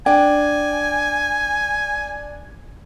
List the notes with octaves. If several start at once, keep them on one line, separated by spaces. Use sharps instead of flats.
D4 G5 G#5